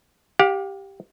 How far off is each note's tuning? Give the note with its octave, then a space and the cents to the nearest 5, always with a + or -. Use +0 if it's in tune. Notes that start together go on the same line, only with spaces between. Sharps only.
G4 +0 F5 +40